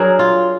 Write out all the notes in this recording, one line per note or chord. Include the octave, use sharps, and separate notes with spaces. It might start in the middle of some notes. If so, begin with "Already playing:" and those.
Already playing: F#3 D4 G#4 A#4
F4